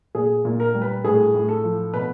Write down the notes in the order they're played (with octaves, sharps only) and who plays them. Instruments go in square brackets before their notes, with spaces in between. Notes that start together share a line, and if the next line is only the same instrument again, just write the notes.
[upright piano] A#2 G#4
A#2
A#4
G3
B4
A2 G#4
A2
A4
F3
B2 B4